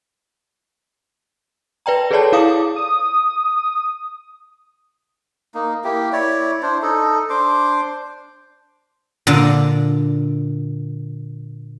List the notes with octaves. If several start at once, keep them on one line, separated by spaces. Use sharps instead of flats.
B4 D5 G5 A#5
G#4 A4 B4 C#5 D5 A5
E4 G#4 F5 D6 D#6
D#6
A#3 D#4
A#3 E4 G4
E4 C#5 D5
D4 E4 C5
D#4 A4
D4 C5 C6 D6
A#2 D3